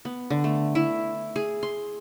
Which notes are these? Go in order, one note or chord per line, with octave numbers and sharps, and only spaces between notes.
B3
D3
A3
E4
G#4
C6